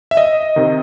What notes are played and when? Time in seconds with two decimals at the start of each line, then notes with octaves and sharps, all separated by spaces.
0.11 E5
0.17 D#5
0.56 C3 D#3